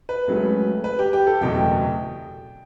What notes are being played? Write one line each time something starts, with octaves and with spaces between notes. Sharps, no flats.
B4
C#2 C#3 F#3 A3
B4
G4
G4
A4
F#1 E2 B2 A3 G5